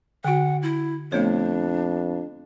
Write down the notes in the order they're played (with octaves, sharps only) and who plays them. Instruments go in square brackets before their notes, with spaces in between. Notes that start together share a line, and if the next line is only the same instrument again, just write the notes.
[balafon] D3 F#4 [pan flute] F#5
[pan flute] E4
[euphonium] F2 [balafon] A3 B3 C#5 [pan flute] D4